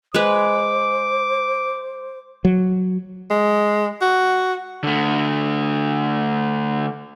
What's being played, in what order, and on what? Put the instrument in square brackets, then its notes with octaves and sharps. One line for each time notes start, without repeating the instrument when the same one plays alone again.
[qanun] G#3 B4 [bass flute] C5 [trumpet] D6
[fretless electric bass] F#3
[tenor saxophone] G#3
F#4
[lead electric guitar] D3 A3